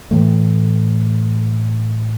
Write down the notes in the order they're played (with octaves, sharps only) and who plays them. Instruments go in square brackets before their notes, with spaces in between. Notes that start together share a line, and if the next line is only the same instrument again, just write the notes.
[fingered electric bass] A2 E3 A3